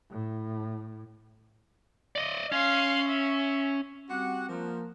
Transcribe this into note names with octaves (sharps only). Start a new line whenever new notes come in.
A2
D5 D#5
C#4 F5 C6
E5
G3 C4 F#4 G4 F#5 D6
F3 A#3 A#4